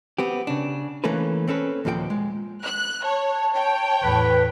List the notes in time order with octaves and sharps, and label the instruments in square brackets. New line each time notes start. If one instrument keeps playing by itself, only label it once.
[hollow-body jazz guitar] B3 C4 G4
C#3 D4
E3 A3 A#3 C#4 A4 B4
C4 C#4 A4 B4
D#2 A#2 F3 G#4 G5
G#3
[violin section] F#6
[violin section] C#5 [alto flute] A5
[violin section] C#5 G5
[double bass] E2 A2 [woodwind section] B4